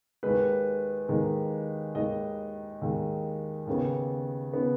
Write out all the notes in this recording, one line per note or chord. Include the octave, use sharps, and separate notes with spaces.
D#2 D#3 G#3 B4
D#2 D#3 G#3
D#2 D#3 G#3 D#5
D#2 D#3 G#3
D#2 C#3 B3
C#3 B3